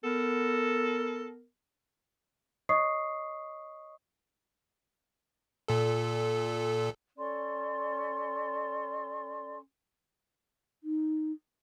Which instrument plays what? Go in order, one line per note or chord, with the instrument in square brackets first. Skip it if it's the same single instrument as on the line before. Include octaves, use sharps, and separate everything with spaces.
[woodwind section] B3 A#4 [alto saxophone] A4
[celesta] C#5 D#5 C#6 D#6 C7
[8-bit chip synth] A#2 A4
[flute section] C#4 A4 D5 C6
[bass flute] D#4